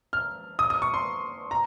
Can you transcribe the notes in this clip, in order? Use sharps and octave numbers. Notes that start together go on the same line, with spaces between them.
F6
D#6
D#6
C#6
C6
A#5